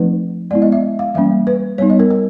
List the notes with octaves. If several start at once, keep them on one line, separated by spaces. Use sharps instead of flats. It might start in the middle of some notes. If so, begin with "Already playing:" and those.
Already playing: F3 A3 C4 D#4 B4
G#3 B3 E4 D5
D#5
E5
F5
E3 G3 A#3 C#4 E5
B4
G3 B3 D#4 C#5
D#5
A#4
A#4